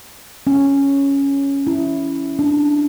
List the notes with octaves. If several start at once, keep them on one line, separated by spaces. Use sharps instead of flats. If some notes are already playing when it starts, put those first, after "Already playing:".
C#4
E4
D4